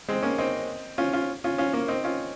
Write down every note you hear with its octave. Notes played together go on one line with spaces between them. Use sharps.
G#3 C4
A#3 C#4
C4 D#4
C#4 F4
C#4 F4
C#4 F4
C#4 F4
A#3 C#4
C4 D#4
C#4 F4